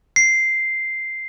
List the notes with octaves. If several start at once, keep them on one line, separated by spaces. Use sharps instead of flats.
C7